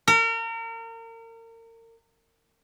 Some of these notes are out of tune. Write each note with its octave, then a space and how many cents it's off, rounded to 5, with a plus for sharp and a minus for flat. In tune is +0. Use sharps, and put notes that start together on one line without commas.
A#4 -35